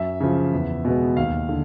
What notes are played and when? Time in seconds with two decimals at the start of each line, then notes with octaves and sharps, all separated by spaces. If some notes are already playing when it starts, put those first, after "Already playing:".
Already playing: F#2 E5
0.21 C#3 F3
0.53 E2
0.85 B2 G#3 B3
1.17 D#2 F5
1.49 D3